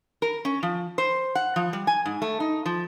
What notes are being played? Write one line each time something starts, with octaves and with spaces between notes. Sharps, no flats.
A#4
C#4
F3
C5
F#5
F3
G3
G#5
G#2
A3
D#4
F3